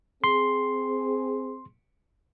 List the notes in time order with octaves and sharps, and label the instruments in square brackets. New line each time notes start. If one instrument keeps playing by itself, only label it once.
[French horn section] C4 G#4 [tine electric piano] C6